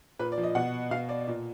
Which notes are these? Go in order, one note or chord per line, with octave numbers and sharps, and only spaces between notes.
A#2 B4
D5
F3
D#5
B2 F#5
B2 F5
D5
A#2